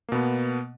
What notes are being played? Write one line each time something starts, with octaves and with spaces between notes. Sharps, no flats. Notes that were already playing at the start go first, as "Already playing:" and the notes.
B2 A#3 B3